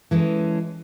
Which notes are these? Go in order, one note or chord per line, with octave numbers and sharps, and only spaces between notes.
E3 G#3 C#4 A4